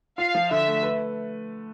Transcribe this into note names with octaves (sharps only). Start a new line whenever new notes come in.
F4 F5
F3
D3 E5
A3
B4